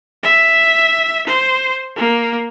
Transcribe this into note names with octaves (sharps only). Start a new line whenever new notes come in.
E5
C5
A#3